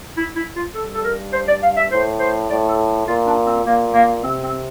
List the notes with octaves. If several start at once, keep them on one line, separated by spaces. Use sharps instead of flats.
E4
E4
F4
G2 A4
A4
A#4
C5
D5
F5
E5
A2 C5
C5
A2 D5
A4
A#2 F4
D4
C4
A#2 A#3
A#3
C3 C4
C4